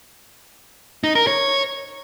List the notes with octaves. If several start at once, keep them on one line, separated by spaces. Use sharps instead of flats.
D#4
A#4
C#5